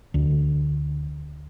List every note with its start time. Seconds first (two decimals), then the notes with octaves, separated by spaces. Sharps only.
0.14 D2